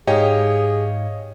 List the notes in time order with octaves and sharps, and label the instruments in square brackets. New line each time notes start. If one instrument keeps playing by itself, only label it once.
[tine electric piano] G#2 F5 [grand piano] G4 [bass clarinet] G#4 [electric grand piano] C#5 D#5